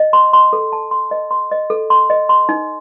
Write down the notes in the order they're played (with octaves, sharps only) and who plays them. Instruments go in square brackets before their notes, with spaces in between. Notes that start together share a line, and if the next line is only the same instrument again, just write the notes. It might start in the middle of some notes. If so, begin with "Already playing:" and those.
Already playing: [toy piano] D#5
C6
C6
A4
A5
C6
D#5
C6
D#5
A4
C6
D#5
C6
D#4